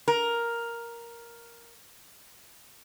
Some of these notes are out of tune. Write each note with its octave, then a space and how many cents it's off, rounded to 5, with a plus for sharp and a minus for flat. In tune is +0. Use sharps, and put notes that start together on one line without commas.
A#4 +5